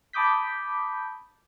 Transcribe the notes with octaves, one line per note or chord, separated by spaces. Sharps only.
A5 B5 D6 D#6 G6 B6